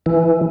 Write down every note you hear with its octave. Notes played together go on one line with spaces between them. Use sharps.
E3